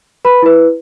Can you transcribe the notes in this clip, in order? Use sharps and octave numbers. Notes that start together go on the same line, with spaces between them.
B4 B5
E4 B4